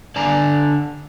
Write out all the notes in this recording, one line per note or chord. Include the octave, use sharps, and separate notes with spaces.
D3 D5 G#5 A#5